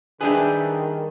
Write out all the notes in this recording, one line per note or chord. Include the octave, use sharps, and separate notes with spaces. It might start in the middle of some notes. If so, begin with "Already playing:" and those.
D#3 G3 D4 G#4 B4 E5 G5